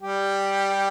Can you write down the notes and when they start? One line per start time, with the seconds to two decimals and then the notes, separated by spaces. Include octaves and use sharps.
0.01 G3 G4